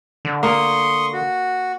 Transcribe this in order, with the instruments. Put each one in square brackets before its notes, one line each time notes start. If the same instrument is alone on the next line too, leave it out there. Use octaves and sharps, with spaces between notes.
[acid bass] D3
[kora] A#3 [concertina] C6 C#6 D#6
[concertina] F#4